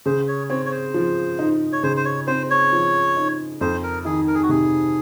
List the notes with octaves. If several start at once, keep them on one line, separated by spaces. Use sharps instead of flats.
C#3 C5
C#5
C4 C#5
C#5
C5
F3
D#4
C#5
C#3 C5
C5
C#5
C4 C5
C#5
F3
D#4
F2 C5
A#4
D#3 G#4
A#4
G#4
F#4
C3 G#4